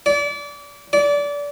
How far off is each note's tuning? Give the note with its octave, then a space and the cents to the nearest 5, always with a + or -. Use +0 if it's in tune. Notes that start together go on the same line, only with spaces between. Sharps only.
D5 -30
D5 -25